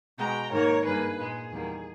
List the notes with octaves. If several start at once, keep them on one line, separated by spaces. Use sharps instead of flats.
B2 G#3 G5 A#5
G#2 D#3 A#3 A#4 C#5
G2 D#3 G3 A#3 G#4 B4
A#2 G#3 G#4
E2 D#3 G3 A#3